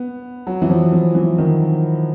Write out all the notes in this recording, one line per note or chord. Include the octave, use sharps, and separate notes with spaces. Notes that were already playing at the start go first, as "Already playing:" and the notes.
Already playing: B3
F#3
E3
F3
F3
E3
D#3